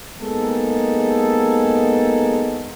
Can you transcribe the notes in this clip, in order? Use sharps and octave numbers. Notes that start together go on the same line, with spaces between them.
G#3 A#3 B3 D#4 G#4 A4